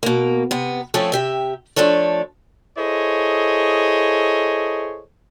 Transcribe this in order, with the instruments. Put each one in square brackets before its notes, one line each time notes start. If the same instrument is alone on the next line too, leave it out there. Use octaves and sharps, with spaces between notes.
[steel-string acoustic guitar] B2 A#3
C3 B3
F3 A3 C4 C#4 A4
C3 G4 E5
F3 A3 D4 A4 C#5
[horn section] E4 G#4 A4 C5 C#5 D#5